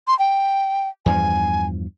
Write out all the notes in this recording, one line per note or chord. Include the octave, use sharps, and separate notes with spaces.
C6
G5
E2 G2 F3 G#5